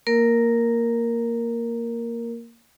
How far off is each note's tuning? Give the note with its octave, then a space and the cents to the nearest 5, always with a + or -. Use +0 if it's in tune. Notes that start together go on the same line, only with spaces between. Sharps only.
A#3 -5 A#4 +0